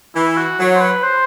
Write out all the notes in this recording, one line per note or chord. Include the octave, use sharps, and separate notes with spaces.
E3 E4
F#4
F#3
C5
B4
C5